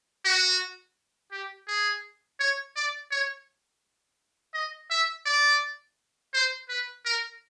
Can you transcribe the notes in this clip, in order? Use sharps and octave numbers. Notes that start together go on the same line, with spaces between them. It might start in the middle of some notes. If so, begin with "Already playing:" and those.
F#4
G4
G#4
C#5
D5
C#5
D#5
E5
D5
C5
B4
A#4